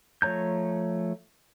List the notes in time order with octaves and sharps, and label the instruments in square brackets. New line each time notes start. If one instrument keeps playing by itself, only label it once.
[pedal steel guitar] F3 A3 C#5 A#5 G6